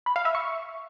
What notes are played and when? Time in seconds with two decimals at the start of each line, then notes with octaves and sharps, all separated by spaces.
0.06 B5
0.16 F5
0.25 E5
0.35 C#6